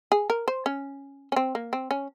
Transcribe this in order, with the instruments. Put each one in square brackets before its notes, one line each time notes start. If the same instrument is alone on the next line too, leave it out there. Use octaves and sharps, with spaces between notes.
[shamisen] G#4
A#4
C5
C#4
C#4
C4
A#3
C4
C#4